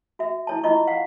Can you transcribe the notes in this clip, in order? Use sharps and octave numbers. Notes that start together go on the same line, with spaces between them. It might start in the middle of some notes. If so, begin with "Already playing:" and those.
F#4 E5
E4 C#5 A5
E4 F4 D#5 C#6
F5 F#5